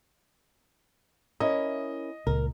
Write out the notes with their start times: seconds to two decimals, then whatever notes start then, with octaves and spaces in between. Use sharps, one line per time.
1.40 C#4 E4 A#4 D#5
2.27 C#2 A#2 A#4